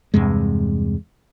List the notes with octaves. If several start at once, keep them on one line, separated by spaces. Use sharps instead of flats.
E2 G2 C3 G#3